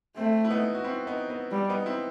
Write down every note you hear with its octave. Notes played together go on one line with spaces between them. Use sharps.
A3 C4
E4
B3 D#4
F#4
C4 E4
B3 D#4
B3
G3
B3 D#4
C4 E4